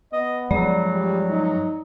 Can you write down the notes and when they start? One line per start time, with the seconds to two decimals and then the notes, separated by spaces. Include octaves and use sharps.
0.13 B3 D#5
0.51 G2 F3 F#3 G#3 D5
0.92 G3
1.30 D#4